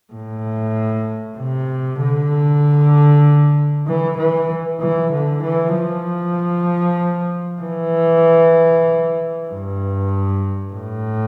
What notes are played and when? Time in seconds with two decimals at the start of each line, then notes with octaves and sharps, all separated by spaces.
0.13 A2
1.38 C3
2.00 D3
3.87 E3
4.18 E3
4.80 E3
5.12 D3
5.43 E3
5.74 F3
7.62 E3
9.49 G2
10.73 A2